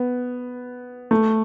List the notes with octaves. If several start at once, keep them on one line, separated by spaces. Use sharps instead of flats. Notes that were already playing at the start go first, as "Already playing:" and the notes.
Already playing: B3
A3